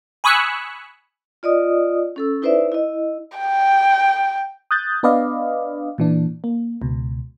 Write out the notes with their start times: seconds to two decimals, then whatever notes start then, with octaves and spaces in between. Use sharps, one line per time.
0.24 G#5 B5 C#6 D#6 E6 F#6
1.43 F4 D5 D#5 D#6
2.16 C#4 A4 E6
2.42 D#4 E4 B4 C5 D5 E5
2.72 E4 D#5
3.38 G5
4.71 D#6 F#6 G6 A6
5.03 B3 D4 B4 D5 D#5 F5
5.98 A#2 E3 D4
6.44 A#3
6.82 C#2 B2